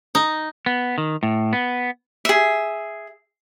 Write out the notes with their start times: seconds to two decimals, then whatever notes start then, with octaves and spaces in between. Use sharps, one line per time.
0.15 D#4
0.66 B3
0.98 D#3
1.23 A2
1.53 B3
2.25 G#4 E5